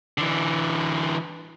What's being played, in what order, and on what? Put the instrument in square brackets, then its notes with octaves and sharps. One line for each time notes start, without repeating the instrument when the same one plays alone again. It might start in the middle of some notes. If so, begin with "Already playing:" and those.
[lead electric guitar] D3 E3